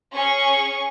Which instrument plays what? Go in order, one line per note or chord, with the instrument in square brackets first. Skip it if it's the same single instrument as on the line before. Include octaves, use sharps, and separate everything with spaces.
[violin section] C#4 G#4 C#6